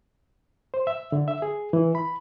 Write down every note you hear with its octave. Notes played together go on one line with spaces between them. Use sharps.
C5
E5
D3
E5
G#4
E3
B5